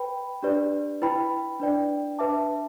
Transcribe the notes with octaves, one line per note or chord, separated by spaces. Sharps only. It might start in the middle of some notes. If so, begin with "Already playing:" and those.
Already playing: B4 G5 B5
D4 G4 B4 D5
E4 B4 G5 B5
D4 B4 D5 G5
D4 B4 E5 A5 D6